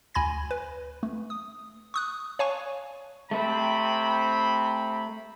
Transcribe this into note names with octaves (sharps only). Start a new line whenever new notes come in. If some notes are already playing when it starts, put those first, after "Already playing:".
D2 G#5 B5 G#6 A#6
B4
A3
D#6
C#6 D#6 F#6
C#5 F5 G#5 A5 C#6
C3 A3 C4 B5